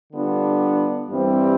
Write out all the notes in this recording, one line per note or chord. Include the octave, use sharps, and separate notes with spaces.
D3 G3 B3 D4 F4
G2 E3 G3 C4